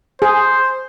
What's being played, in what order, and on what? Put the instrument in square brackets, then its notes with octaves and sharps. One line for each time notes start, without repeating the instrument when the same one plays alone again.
[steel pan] G#4 [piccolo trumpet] C5